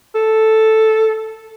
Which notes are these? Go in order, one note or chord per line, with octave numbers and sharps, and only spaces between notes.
A4